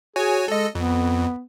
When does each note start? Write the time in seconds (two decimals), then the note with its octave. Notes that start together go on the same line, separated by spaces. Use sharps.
0.16 F#4 G#4 C#5 G#5
0.48 G#3 A4 D#5
0.75 F2 B3